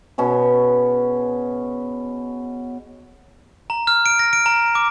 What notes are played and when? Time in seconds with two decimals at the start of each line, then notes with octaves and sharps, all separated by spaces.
0.18 B2 C#4 G#4
3.70 A#5
3.87 F6
4.06 D7
4.19 A#6
4.33 D7
4.46 A#5
4.75 D6